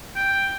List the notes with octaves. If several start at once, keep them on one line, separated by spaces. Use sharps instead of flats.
G5